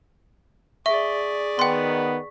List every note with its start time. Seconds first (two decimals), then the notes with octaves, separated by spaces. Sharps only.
0.86 G#4 D5 E5 C#6 B6
1.59 D#3 B3 G5 C6